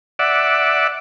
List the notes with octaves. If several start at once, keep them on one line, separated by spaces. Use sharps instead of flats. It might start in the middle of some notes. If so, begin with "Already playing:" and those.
D5 E5 F#5